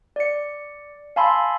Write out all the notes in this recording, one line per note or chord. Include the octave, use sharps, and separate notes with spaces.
D5 C#7
F5 G#5 A5 B5 C6 E6